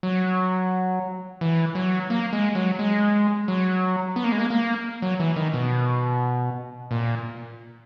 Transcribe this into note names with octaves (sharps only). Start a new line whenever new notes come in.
F#3
E3
F#3
A#3
G#3
F#3
G#3
F#3
B3
A#3
G#3
A#3
A#3
F#3
E3
D#3
B2
A#2